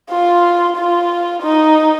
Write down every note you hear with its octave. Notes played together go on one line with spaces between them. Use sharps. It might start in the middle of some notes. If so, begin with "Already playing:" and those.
F4
F4
D#4